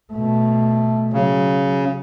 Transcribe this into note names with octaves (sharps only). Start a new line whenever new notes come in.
B2 A3
C#3 F#3